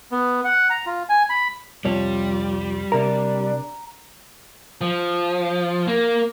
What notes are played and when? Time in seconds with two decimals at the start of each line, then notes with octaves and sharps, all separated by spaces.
0.12 B3
0.45 F#5
0.70 A#5
0.86 F4
1.09 G#5
1.30 B5
1.85 C2 F2 G3 F4 C#5
2.92 C3 D4 A#4 A#5
4.81 F3
5.87 A#3